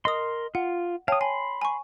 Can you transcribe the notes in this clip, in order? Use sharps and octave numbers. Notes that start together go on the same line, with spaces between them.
A#4 D#5 C6 D#6
F4 F#5
C#5 F5 G5 A5 D#6
G#5 B5 C6
G#5 C#6